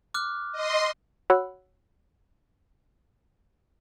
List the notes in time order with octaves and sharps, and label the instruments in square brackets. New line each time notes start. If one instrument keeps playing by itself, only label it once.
[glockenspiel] D6 F6 F#6
[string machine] D#5 C6
[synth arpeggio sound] F#4 C#5 F#5 B5 E6 F#6